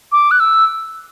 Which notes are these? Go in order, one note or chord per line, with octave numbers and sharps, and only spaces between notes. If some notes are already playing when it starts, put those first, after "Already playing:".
D6
F#6
E6